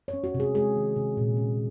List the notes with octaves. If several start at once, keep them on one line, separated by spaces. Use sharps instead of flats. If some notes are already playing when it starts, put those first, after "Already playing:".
C#5
C#4
F#4
C3
G#4
G#3 G#4
D#3
C3
A#2
C#4